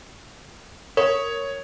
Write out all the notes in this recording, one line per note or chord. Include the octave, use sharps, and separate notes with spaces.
A#4 C#5